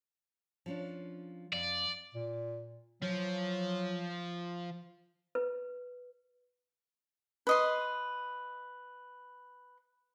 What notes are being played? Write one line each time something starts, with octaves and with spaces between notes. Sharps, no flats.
F3 C#4 D4
F2 D5
A#2
F3 F#3
B4
B4 D#5 C6